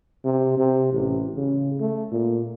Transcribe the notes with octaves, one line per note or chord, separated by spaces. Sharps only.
C3
C3
A1
C#3
A3
A#2